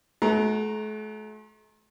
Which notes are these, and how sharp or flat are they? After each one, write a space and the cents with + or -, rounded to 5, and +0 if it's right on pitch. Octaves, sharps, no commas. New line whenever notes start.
A3 -45 F#4 +0 A#5 +0